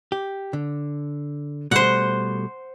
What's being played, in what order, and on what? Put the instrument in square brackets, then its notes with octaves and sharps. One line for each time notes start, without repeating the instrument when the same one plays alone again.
[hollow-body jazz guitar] G4
D3
[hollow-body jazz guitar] B2 G3 A3 [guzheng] C5 F#5